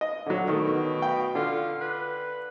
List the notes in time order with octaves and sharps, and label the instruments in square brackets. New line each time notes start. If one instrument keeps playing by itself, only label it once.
[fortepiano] D#5
D3 F#3
[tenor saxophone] B2 [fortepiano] D#3 A3
[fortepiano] G5
[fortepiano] D3 [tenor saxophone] F4
[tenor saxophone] B4